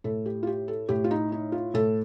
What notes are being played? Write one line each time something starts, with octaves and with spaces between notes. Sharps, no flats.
A2 A4
G4
F4
G4
A4
A2 G4
F4
D#4
D#4
F4
A2 A4